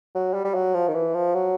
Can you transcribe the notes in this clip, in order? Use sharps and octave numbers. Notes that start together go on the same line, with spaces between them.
F#3
G3
G3
F#3
F3
D#3
E3
F3
F#3